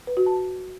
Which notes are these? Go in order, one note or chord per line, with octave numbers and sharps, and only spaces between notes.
B4
F#4
A5